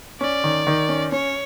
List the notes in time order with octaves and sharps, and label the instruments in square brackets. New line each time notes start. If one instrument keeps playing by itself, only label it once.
[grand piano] C#4 [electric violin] D5
[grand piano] D#3
D#3
C#4
[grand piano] C#4 [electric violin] C#5